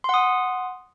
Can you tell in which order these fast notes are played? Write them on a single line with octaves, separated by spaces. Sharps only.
C6 F#5 D#6